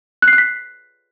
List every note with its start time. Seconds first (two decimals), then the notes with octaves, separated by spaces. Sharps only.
0.22 F#6
0.28 C7
0.33 F#6
0.38 B6